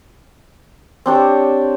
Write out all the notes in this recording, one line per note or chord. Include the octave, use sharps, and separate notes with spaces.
C4 D4 G4 C#5